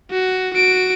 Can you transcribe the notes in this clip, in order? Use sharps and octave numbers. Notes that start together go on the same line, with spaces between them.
F#4
F#4 D7